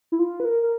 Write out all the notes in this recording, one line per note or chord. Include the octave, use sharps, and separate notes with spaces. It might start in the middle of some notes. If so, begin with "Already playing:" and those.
E4
F4
B4
A#4
A#4